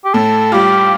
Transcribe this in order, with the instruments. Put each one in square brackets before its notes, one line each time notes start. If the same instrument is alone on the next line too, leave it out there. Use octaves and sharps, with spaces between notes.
[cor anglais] G4
[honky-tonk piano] A2 [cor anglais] A4
[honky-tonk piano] G3 F4 [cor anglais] G4